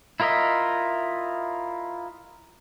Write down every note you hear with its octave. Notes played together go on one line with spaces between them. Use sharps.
E4 F4 A#4 D#5 E5